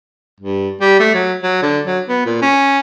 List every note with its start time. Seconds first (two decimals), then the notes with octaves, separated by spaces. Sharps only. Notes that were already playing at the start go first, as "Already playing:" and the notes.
0.40 G2
0.81 G3
1.00 A3
1.15 F#3
1.43 F#3
1.62 D3
1.85 F#3
2.09 B3
2.26 A#2
2.42 C#4